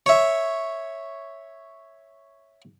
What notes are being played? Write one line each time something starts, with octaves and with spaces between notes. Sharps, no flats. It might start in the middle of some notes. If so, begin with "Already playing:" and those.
C#5 E5